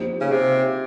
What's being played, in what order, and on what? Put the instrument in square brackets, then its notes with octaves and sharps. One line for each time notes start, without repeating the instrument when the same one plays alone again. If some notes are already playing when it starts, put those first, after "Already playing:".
Already playing: [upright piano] F3 A#3 D#4 G4 C5
[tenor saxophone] C#3
C3